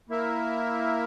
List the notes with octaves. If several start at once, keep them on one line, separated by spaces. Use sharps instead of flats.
A#3 E4 A#4 E5